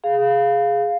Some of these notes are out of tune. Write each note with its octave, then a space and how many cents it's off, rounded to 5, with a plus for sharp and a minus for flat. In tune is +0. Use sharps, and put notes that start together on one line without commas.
G#4 +0 F5 +0